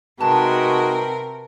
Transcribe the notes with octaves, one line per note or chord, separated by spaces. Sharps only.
C3 G#3 D#4 F#4 A#4 B4 G5 A5